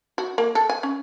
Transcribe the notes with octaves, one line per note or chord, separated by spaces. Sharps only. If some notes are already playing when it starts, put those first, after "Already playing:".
F#4
A#3
A4
G#5
C#4